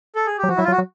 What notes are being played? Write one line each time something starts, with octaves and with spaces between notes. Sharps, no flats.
A4
G#4
G4
F#3
F3 F#4
F#3 E4
F4
F#3
F#4
F#3